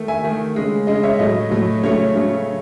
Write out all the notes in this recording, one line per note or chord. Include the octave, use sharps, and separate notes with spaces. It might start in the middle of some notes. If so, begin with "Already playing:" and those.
Already playing: D#3 A3
E5 G#5
D#3 A3
C#3 G#3
C#3 G#3 D#5
C#5 E5
A2 F#3 A3 D#5
A2 F#3 A3
C#3 F#3 A3 C#5
C#3 F#3 A3